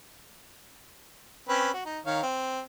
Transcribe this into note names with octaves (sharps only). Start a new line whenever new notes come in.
C4 C#4 B4
F#4
D#4
D#3 C#5 F5
C4